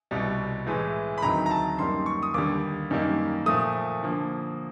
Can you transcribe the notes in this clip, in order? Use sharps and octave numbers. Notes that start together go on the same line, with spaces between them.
C2 B2 G3
A2 E3 G#3
B5
D2 C3 D#3 F#3 A#5
A#5
A5
F#2 D#3 G3 A#3 C6
C#6
D#6
D#2 D3 G3 D6
F#2 D#3 G3 A#3
A#2 F3 A3 D#6
D3 F3 A#3